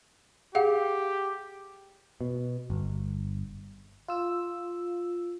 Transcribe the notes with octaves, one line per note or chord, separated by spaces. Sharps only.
G4 G#4 F5 F#5
B2
G1
F4 E6